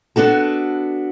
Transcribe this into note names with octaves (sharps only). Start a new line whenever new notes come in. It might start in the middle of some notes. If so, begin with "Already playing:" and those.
B3 D4 F#4 A4